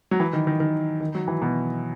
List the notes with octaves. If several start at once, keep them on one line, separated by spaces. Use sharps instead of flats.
F#3
E3
D#3
D#3
D#3
D#3
F#3
E3
B2